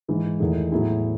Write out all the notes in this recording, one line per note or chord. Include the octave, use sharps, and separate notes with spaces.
G#2 E3 G#3
E2 D#3 A3 E4 G#4
A2 F#3 B3 E4 G#4